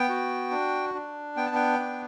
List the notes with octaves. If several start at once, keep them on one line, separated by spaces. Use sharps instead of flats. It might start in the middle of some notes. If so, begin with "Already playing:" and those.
Already playing: B3 G5
F#4
D4
D4
B3 G5
A5
G5
D4